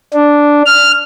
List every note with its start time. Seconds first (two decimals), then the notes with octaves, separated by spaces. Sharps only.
0.14 D4
0.66 F6